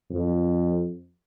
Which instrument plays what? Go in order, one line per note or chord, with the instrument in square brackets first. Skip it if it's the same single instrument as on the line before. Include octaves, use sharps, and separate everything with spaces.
[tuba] F2